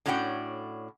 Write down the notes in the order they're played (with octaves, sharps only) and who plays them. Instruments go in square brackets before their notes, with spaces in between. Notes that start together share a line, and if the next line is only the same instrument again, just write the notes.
[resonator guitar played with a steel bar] A2 C#4 D4 F#4 F#5 G5